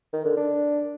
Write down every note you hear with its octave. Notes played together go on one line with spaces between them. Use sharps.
D#3
D3
D4